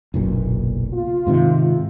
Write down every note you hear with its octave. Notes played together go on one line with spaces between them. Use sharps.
F#1 B1 A#2
F4
G#2 C3 D#3